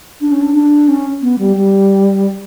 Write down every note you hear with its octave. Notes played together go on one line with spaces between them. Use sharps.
D4
C#4
D4
D4
C#4
B3
G3
G3